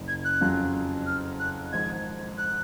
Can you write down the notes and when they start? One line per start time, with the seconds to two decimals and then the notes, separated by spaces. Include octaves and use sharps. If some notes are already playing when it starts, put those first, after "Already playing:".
Already playing: F#1 F#2 C#3
0.08 G#6
0.25 F#6
0.41 F2 C#3 F#3 C#4 F4
1.06 F6
1.40 F#6
1.73 G#1 G#2 F3 G#3 D#4 G#6
2.38 F#6